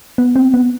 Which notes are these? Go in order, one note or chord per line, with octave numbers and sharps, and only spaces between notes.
B3
C4
B3